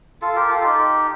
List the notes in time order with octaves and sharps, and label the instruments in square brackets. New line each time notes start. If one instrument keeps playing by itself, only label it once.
[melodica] F4 A4
G4 A#4
F4 A4
D#4 G4